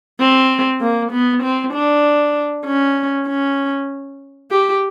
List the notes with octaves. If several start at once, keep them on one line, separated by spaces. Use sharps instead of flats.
C4
A#3
B3
C4
D4
C#4
C#4
G4